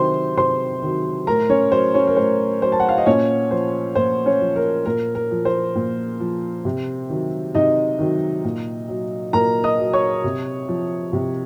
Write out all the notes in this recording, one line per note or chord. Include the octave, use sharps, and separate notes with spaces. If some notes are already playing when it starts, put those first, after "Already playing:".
Already playing: C3 D#3 F#3 C5 C6
C3 C5 C6
D#3 F#3
A2 A#4 A#5
C#4 C#5
F#3 C5
C#4 C#5
A#4
A2 C5
F#3 C5
A5
F#5
F5
D#5
A#2 C#4 C#5
F3 C5
A#2 C5
C#4 C#5
F3
A#4
A#2 A#4
A#4
F3
C5
A#2
F3
C3
D#3 F#3
C3 D#4 D#5
D#3 F#3
A#2
F#3
A#2 A#4 A#5
D#5 D#6
F#3
C#5 C#6
C3
F3
C3